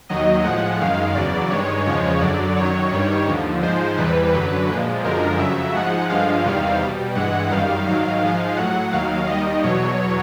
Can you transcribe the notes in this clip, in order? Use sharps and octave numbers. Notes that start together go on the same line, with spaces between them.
D#2 D#3 F#3 D#5
A2 F3 G#3 F#5
F#2 D#3 G#3 F5
E2 C#3 F#3 D5
G2 D#3 G#3 C#5
E2 C#3 F3 G#3 C#5
F#2 D3 F#3 D5
F#2 D#3 F#3 C#5
G2 D#3 G3
D#2 D3 F3
G#2 F3 G#3 C5
E2 C3 E3 G3 B4
F#2 D3 F#3
A#2 F3 G#3
F#2 D3 F3 G#3 A#4
F2 C#3 F#3 E5
G#2 F3 G#3 F#5
G2 D3 F3 G#3 F5
E2 C3 D#3 G3
B2 G3
G2 E3 G#3 F#5
F#2 D#3 G3 F5
G#2 D#3 F#3 F5
G#2 F3 G#3
A2 F#3 F#5
D#2 D#3 F#3 F5
D#2 D#3 G3 D#5
E2 B2 F#3 C#5